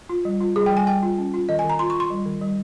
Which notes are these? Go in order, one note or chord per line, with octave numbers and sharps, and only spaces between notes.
F4
G3
F4
G3 G#4
G3 G5
G#5
G3 G5
F4
C#4
F4
D#3 D#5
G#5
D#3
A#5
F4 C6
C#6
F4
C6
G3
D#3
G3